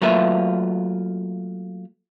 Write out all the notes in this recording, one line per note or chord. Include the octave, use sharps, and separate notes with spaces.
F#3 A3 A#3 F4 B4 E5